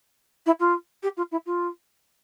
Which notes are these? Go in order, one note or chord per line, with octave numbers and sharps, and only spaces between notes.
E4
F4
G4
F4
E4
F4